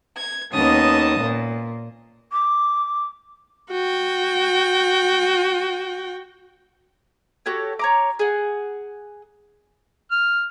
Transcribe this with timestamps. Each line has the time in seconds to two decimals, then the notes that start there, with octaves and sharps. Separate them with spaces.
0.18 G#6
0.53 D#2 B3 C#4 D#5 A5 D#6
1.19 A#2
2.32 D6
3.71 F#4 G5
7.46 F#4 G4 A4 C#5
7.79 C#5 A#5 D6
8.19 G#4 F#5
10.11 F6